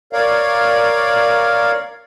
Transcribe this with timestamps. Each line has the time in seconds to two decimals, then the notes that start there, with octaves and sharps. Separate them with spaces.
0.13 A#4 C#5 D5 F5